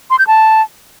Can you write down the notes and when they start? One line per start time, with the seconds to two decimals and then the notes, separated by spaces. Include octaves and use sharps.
0.10 C6
0.19 G6
0.27 A5